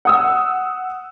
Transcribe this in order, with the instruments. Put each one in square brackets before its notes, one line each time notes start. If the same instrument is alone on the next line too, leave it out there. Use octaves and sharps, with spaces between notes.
[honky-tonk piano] F#5 D#6 E6